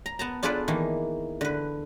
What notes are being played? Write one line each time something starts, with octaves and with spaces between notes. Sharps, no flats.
A#5
B3 A5 A#5
D4 F4 G#4 A4 B4 D5
D#3 E3 A#3
D3 B4